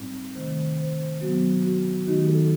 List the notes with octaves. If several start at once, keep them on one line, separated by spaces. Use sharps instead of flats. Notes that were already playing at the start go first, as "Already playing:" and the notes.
Already playing: A2 G3 C4 D#4
C3 D#3 A3 C5
C5
B2 F#3 B3 F#4
F#4
D#3 A3 D#4 F#4
G4
A4
A4